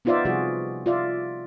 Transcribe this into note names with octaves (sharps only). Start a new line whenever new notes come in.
B3 D#4 F4 C5 D5 E5
C3 F3 G3 F4 F#4 G#4
F4 D5 E5